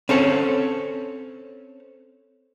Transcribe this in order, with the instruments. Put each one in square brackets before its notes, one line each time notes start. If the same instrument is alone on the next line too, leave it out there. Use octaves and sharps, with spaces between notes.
[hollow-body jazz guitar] C4 C#4 A4 C#5